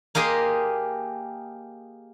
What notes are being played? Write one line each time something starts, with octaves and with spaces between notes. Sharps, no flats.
A#3 G4 G#4 D#5 C6